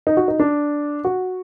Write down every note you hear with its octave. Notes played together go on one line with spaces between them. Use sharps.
D#4
F#4
D#4
D4
F#4